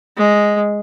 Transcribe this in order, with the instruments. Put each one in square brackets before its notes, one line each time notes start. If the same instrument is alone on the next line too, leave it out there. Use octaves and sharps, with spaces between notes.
[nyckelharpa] G#3